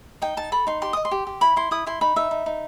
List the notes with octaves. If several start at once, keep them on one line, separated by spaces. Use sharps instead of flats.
D#4 G5
D#4 A5
A4 B5
D#4 C6
G4 C6
D#5 D#6
C6
G4
G4
E4 B5
E4 C6
E4 D#6
E4 C6
D#4 B5
D#4 E5
D#4
D#4